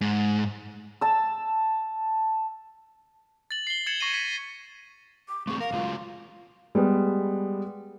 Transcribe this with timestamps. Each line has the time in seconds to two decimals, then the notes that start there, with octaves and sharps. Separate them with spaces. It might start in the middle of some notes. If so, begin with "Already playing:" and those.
0.01 G#2
1.01 A5 E6
3.51 A6 F#7
3.67 C7 G7
3.86 G#6 A6 C#7 E7 F#7
4.01 C#6 A#6 C7 D#7
4.14 B6
5.29 D6
5.47 A3 C4 G#4 C#6
5.60 A#4 F5
5.73 F#3 G#3 F4
6.75 G3 G#3 B3